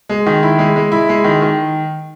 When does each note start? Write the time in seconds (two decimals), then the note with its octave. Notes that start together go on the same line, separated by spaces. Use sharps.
0.09 G#3
0.26 D#3
0.43 E4
0.59 G#3
0.76 G#3
0.92 E4
1.09 G#3
1.24 D#3
1.42 D#3